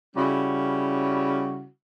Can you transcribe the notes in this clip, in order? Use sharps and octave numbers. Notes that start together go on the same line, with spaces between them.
C#3 G3 C#4 E4 F#4